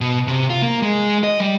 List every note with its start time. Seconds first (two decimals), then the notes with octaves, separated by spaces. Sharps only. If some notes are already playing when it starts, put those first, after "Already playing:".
0.01 B2
0.28 C3
0.50 F4
0.62 A#3
0.82 G#3
1.24 D#5
1.40 G3